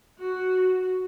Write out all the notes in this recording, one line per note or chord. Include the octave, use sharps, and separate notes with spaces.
F#4